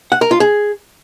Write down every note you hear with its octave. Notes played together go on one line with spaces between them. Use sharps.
F#5
A#4
F4
G#4